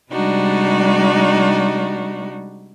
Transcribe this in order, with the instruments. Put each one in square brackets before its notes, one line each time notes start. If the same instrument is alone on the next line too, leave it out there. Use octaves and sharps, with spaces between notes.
[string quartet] C3 G3 G#3 D4 D#4 F#4